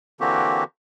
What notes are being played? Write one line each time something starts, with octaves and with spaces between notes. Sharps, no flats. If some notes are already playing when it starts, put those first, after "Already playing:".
D3 E3 A#3 C4 F#4 G4